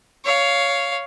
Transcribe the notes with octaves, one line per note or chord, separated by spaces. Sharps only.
C#5 F5